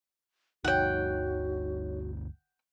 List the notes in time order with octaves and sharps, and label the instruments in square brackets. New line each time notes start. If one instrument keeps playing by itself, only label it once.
[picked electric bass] G1 D2 [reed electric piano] D#4 C#5 [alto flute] F#4 [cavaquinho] F#5 G5